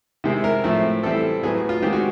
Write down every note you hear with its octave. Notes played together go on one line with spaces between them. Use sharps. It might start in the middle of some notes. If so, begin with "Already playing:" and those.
C3 D#3 G#3 C4 E4
A#4
A2 F3 A3 C4 E4
E3 G3 C4 E4 A4
A2 F#3 B3 G#4
F4
D#3 G#3 C4 G4
F#4